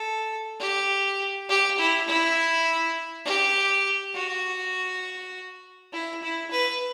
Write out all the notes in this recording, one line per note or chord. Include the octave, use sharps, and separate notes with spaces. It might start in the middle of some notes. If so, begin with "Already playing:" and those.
Already playing: A4
G4
G4
E4
E4
G4
F#4
E4
E4
B4